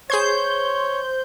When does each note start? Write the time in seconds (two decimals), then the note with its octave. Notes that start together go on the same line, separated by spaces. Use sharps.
0.10 G#4 C5 C#5 C6 G6 G#6